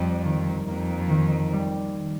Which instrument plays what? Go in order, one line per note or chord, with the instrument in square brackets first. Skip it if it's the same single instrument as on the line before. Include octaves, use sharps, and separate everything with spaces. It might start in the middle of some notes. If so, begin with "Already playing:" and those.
Already playing: [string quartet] F2 [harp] G3
[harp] D#3
[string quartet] F2 [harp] A#3
[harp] D#3
G3